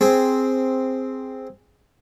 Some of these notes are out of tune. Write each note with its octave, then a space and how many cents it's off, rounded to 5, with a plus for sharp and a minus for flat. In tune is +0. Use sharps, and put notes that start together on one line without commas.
C4 +0 G#4 +0